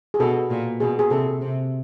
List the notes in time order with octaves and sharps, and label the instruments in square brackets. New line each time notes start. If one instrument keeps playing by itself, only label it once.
[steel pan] G#4
[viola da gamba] B2 [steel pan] A4
[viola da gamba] A#2
[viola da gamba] B2 [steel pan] G#4
[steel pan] G#4
[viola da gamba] C3 [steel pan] A4
[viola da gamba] C3